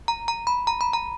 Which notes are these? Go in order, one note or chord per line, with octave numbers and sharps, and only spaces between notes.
A#5
A#5
B5
A#5
B5
A#5